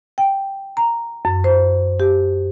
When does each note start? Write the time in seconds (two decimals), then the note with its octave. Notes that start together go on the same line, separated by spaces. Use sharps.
0.18 G5
0.77 A#5
1.25 F#2
1.44 C5
2.00 G4